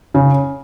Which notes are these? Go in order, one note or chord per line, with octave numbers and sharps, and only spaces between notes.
C#3